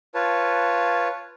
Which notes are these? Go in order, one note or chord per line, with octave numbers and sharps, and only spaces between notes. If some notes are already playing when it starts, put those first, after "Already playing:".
F4 B4 C#5 A5